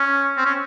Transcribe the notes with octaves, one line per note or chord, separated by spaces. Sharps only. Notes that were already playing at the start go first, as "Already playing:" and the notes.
Already playing: C#4
C4
C#4